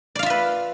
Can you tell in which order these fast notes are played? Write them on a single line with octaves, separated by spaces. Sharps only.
D5 F5 F4 E5 B4